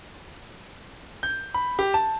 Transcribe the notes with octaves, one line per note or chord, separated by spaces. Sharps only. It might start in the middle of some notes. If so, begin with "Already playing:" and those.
G6
B5
G4
A5